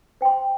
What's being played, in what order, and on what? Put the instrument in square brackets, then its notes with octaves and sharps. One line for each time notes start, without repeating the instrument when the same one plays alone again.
[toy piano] C5 G5 C6